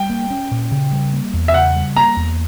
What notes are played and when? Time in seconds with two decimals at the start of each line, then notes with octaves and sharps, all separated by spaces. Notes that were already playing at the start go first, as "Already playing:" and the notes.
Already playing: G3 G5
0.10 A#3
0.30 C#4
0.51 A#2
0.71 C#3
0.92 G3
1.13 A#3
1.33 E2
1.48 E5
1.54 C#3 F#5
1.76 G3
1.96 A#3 A#5
2.17 E2